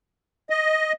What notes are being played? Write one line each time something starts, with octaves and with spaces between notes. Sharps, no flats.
D#5